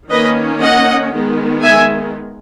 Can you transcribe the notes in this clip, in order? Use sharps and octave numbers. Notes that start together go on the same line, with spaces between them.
D#3 A#3 C#4 B4 D#5
D#5 F#5
D#3 G#3 B3
E5 G#5